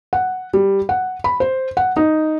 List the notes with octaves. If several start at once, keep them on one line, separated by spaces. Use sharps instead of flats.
F#5
G3
F#5
B5
C5
F#5
D#4